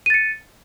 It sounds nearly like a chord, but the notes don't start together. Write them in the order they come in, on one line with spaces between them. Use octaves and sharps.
D#7 A6 C#7